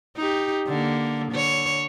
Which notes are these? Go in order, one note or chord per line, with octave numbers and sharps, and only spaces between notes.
D#4 G4
D3 A#3
D3 C#5